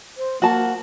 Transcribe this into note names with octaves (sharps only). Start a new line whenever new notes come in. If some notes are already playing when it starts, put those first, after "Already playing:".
C5
A#3 F#4 A5